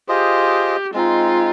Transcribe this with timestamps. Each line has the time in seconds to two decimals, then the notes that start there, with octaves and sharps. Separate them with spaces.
0.08 F4 G4 G#4 C5 D#5
0.94 G#3 C4 D#4 F4